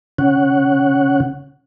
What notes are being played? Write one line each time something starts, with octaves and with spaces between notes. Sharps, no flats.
C#3 C#4 F#5